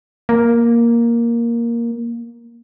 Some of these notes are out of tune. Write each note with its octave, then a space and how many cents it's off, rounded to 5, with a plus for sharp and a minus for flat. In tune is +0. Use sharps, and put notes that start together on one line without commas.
A#3 +5